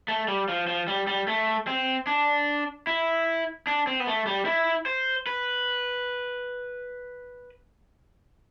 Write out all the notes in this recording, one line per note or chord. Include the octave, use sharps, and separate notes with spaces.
A3
G3
F3
F3
G3
G3
A3
C4
D4
E4
D4
C4
B3
A3
G3
E4
C5
B4